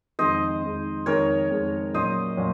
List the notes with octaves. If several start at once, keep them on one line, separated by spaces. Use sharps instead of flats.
F2 D#3 G#3 C5 D#5
F2 D#3 G#3
F2 D#3 G#3 A#4 C#5
F2 D#3 G#3
A#2 F#3 C#4 C5 D#5
A#2 F#3 C#4